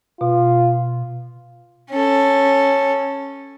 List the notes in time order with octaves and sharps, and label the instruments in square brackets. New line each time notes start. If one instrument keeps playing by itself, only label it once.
[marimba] B2 [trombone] F4
[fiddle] C#4 A4